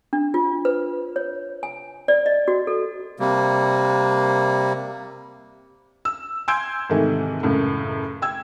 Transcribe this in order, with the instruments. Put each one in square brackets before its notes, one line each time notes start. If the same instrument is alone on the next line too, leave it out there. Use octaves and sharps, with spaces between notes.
[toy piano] D4
F4
B4
C#5
G#5
D5
D#5
F#4
A4
[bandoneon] C3 G3 A#3
[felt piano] E6
G#5 C6 E6 G6 G#6 D7
G#2 C3 D#3 E3 A3
C#2 F#2 A2
G5 E6 G#6